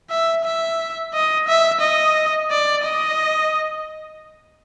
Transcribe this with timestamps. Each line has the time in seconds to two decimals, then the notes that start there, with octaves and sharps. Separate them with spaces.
0.10 E5
0.45 E5
1.14 D#5
1.48 E5
1.81 D#5
2.51 D5
2.84 D#5